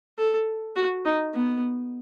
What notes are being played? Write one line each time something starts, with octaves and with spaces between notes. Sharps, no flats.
A4
F#4
D#4
B3